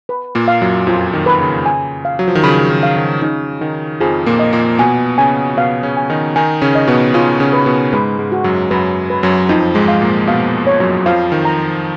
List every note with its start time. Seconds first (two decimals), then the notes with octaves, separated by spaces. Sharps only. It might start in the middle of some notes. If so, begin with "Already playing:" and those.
0.09 B4
0.35 A#2 A#3
0.48 F5
0.61 F#2 F#3
0.87 F2 F3 F4
1.14 D#3
1.26 B4
1.40 C#3
1.66 G#5
2.05 F5
2.19 F#3
2.28 F3
2.35 D#3
2.43 C#3 B5
2.70 D#3
2.83 F5
2.97 D#3
3.22 C#3 D#4
3.61 D#3 D#4
4.00 F2 F3 G#4
4.26 A#2 A#3
4.39 D#5
4.53 A#2 A#3
4.79 B2 B3 G#5
5.18 C#3 C#4 G#5
5.57 B2 B3 F5
5.83 C#3 C#4
5.97 G#5
6.10 D#3 D#4
6.36 D#3 D#4 G#5
6.62 C#3 C#4
6.75 D#5
6.88 B2 B3
7.14 C#3 C#4 F4
7.40 C#3 C#4
7.53 B4
7.66 B2 B3
7.93 G#2 G#3 B4
8.19 G#2 G#3
8.32 F#4
8.44 F#2 F#3
8.70 F#2 F#3 B4
9.10 B4
9.23 F#2 F#3
9.49 F2 F3 D#4
9.75 G#2 G#3
9.88 F5
10.01 A#2 A#3
10.27 B2 B3 F5
10.67 C#5
10.80 F#2 F#3
11.06 F2 F3 F5
11.32 D#3
11.45 A#5